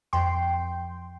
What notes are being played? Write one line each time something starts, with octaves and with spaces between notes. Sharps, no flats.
F2 G5 C6